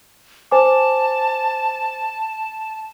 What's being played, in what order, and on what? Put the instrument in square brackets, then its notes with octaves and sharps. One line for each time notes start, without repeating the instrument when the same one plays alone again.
[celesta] C5 G#5 D6 [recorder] A5